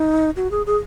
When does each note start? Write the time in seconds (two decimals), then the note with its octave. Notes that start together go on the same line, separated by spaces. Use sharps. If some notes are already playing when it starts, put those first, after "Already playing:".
Already playing: D#4
0.36 F#4
0.51 G#4
0.66 G#4